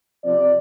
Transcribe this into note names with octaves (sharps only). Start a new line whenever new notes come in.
C3 F3 C4 D5